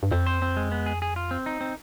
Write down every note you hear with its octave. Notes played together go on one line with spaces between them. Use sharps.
G2
F2 C4
C5
C4
G#3
B3
G#4
G#4
F4
C4
D#4
C4